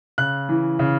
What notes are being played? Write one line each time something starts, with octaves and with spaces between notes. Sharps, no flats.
C#3 F#6
E3
C#3